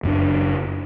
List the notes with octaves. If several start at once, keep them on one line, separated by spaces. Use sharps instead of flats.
F#1 F#2 F#3 D4